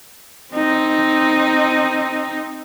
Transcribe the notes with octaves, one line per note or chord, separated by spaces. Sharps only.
C4 D#4